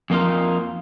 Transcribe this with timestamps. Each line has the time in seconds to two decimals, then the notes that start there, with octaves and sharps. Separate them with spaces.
0.10 F2 A#3 D#4 F4